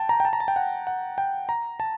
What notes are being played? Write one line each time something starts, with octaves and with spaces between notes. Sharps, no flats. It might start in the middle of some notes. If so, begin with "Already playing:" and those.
Already playing: G5 A5
A#5
G5
A5
A#5
A5
G5
F#5
F#5
G5
A#5
A5